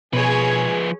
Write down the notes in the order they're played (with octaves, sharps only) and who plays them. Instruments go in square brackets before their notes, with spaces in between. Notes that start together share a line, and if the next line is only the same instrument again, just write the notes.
[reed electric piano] B2 [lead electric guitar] F3 B4 [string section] G#4 C#5